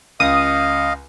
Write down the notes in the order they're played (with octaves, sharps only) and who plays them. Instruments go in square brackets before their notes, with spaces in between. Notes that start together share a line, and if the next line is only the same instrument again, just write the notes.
[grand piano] C#2 [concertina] D#5 F5 [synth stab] D#6